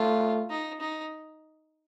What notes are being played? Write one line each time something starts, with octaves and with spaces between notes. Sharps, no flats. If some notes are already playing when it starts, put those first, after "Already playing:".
Already playing: A3 F4
D#4
D#4